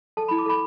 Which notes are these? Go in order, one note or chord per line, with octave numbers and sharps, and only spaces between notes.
A4 A5
B5
E4
D6
A4 B5